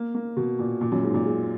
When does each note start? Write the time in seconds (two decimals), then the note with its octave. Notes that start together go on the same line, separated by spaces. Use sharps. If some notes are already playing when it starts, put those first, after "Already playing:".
Already playing: A#3
0.15 A#3
0.37 B2
0.59 A#2
0.81 A#2
0.92 F#2
1.03 G#2
1.14 A#2
1.25 G#3